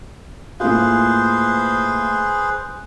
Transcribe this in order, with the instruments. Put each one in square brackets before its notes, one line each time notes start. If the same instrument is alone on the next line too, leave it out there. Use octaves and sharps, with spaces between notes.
[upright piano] A2 A#3 F4 [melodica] G#4 B4 C5